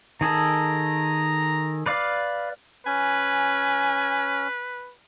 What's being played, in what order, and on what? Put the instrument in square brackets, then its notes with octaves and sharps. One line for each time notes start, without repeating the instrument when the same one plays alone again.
[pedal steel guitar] D#3 G#4 A4 [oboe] A#5
[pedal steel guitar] B4 D5 F5
[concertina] C#4 [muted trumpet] B4 [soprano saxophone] G#5